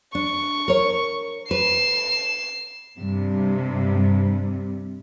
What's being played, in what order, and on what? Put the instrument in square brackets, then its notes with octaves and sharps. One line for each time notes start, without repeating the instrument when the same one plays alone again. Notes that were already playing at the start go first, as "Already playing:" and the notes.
[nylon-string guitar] D4 [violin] C#6
[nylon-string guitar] A#4 C#5
[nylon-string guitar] B4 [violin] C7 E7
[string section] G2 C3